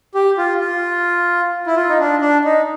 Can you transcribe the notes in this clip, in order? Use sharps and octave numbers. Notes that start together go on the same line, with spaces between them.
G4
F4
F4
E4
F4
D#4
D4
D4
D#4